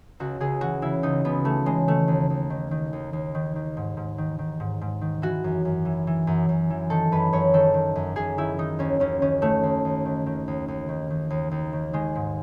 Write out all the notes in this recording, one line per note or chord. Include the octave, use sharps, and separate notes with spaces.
C#2 F#4
C#2 G#4
E3 F#4
C#3 E4
C#2 D#4
C#2 B3
E3 A3
C#3 G#3
D#3 A3
D#2
D#2
D#3
D#3
D#2
D#2
D#3
D#3
G#2
G#2
D#3
D#3
G#2
G#2
D#3
E3 F#4
F#2
F#2
E3
E3
F#2
F#2
E3
D#3 A4
F#2 B4
F#2 C#5
D#3 A4
D#3
F#2
F#2 G#4
D#3 E4
D#3 D#4
D#2 C#4
D#2 C#4
D#3 C#4
D#3 A3
D#2
D#2
D#3
D#3
D#2
D#2
D#3
D#3
D#2
D#2
D#3
D#3 G#3
G#2